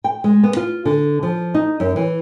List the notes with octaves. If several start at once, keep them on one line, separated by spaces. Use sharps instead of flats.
G5
G#3
B3
F4
D3
F3
D#4
F#2
E3